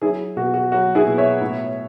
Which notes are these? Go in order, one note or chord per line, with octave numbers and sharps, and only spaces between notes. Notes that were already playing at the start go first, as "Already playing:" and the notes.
F#3 E4 G#4
B2 F#4
F#4
F#3 F#4
E4 G#4
B2
C#5 E5
A2